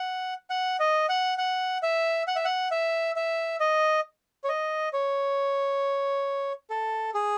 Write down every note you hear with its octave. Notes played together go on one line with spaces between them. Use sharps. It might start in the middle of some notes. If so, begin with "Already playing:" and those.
Already playing: F#5
F#5
D#5
F#5
F#5
E5
F#5
E5
F#5
E5
E5
D#5
C#5
D#5
C#5
A4
G#4